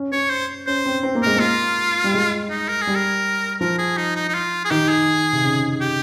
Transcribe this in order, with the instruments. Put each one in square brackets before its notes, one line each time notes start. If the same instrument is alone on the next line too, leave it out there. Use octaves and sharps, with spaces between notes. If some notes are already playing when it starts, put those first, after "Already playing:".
Already playing: [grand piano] C#4
[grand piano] C#4 [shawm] C#5
[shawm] C5
[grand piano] C#4 [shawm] C5
[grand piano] C4
C4
A#3
[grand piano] G#3 [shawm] A#4
[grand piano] A#3 [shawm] F4
[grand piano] G3
G#3
[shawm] D#4
A#4
G#4
[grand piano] G3
[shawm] A#4
[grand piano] F3 [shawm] A#4
[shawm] G#4
D#4
D#4
D#4
F4
G#4
[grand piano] D#3 [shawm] G4
[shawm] G#4
[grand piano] C3
C#3
[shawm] G4